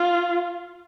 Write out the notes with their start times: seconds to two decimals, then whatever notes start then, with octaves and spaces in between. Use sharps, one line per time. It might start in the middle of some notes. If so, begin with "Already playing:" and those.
Already playing: F4